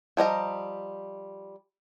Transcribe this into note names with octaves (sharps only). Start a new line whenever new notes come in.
F3 G3 D#5 A#5